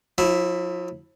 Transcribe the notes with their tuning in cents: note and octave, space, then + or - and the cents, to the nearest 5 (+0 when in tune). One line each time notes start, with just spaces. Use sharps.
F3 +45 E4 +0